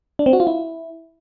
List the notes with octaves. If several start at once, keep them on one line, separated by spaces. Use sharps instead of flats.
D4
C4
F#4
F4
E4